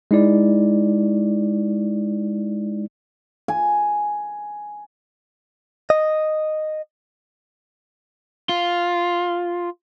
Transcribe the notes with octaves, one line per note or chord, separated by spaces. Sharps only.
G#3 D#4 E4 D5
G#5
D#5
F4